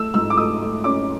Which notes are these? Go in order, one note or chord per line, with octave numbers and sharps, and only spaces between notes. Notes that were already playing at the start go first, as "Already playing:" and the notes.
Already playing: A3 E6
G#2 E6
D6
A3 D#6
A3
C#4 D6